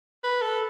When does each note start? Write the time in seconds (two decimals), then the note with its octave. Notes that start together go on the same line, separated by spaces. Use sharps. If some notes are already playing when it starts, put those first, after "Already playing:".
0.24 B4
0.42 A4